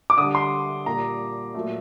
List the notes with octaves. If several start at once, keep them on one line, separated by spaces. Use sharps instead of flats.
D6
D3 G3 D#6
C6
A#2 G3 A#5
A#2 F#3 A3